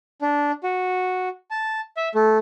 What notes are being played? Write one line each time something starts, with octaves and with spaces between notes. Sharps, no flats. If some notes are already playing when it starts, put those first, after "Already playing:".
D4
F#4
A5
E5
A3